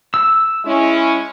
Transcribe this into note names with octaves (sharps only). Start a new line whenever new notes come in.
E6
G#3 C#4 E4